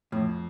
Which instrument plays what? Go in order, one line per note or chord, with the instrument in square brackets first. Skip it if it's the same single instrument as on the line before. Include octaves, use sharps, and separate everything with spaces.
[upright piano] F2 [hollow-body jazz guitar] A2